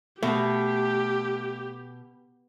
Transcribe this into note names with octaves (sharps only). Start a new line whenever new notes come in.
B2 A3 G4